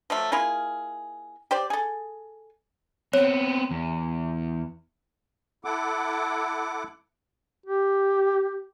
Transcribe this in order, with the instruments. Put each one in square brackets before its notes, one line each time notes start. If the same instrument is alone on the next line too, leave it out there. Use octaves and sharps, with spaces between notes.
[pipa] F3 F#3 A3
A#3 E4 F4 G#4
G4 C5 D5
G#4 A4
[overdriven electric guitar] B3 C4 [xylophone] C#5
[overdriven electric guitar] E2
[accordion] E4 A4 F#5 D6
[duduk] G4